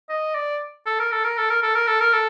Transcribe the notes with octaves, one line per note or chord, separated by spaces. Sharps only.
D#5
D5
A4
A#4
A4
A#4
A4
A#4
A4
A#4
A4
A#4
A4